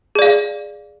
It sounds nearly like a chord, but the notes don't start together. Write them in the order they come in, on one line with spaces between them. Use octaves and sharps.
G#4 D5 F5